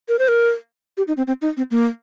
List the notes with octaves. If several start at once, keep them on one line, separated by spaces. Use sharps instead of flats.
A#4
C5
A#4
G4
D#4
C4
C4
D#4
C4
A#3